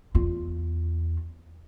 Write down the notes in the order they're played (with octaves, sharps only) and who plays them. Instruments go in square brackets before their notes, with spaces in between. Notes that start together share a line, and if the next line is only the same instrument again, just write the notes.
[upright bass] E2 F4